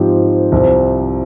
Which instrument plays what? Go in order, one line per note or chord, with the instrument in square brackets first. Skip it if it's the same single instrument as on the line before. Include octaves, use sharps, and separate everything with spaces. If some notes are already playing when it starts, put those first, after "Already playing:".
Already playing: [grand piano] G#2 F3 C4 G4
C2 C3 F3 C4